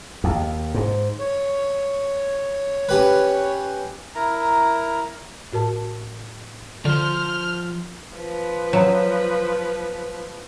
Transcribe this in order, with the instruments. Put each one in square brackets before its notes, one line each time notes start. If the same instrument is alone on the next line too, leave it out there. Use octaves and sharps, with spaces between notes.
[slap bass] D#2
G#2
[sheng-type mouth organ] C#5
[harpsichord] C#4 G4 B4
[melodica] E4 A#4 A#5
[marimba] A2 F#4 A#4 A5
[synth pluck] D3 [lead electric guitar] F3 C5 [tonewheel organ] F6
[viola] F3 B4
[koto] F#3